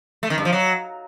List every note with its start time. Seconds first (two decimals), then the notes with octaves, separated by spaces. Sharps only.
0.23 A3
0.30 D#3
0.38 G2
0.45 F3
0.53 F#3